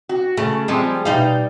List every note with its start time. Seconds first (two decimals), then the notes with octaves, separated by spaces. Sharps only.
0.09 F#4
0.37 C#3 A3
0.68 F3 G3 G#3 C4
1.05 B2 G3 D#4 F5